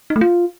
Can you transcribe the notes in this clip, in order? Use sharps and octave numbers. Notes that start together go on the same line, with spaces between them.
D#4
A3
F4